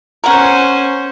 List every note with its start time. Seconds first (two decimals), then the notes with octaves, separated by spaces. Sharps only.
0.24 C#4 A#4 C5 F#5